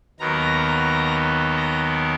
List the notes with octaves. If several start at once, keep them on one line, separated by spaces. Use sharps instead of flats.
D#2 D#3 F#3 B3 A#5
A#5